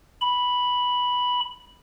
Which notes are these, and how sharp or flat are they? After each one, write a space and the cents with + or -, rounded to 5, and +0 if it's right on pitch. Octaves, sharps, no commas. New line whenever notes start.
B5 -5